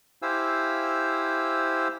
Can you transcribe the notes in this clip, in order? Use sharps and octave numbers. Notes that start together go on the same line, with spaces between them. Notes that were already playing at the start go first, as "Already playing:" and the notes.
E4 G4 C5 F5 G#5 E6